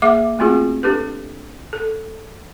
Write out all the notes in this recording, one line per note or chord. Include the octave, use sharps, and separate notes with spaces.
A#3 G#4 E5 D6
A3 B3 C4 F4 F#4 G#4
D4 G4 A4 B4
A4